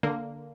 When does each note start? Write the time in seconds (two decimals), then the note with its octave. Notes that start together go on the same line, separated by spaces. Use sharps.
0.03 D3 A#3